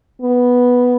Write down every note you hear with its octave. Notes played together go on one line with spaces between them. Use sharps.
B3